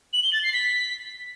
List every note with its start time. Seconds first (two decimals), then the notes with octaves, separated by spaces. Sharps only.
0.13 F#7
0.23 G7
0.33 A6
0.43 C7
0.53 B6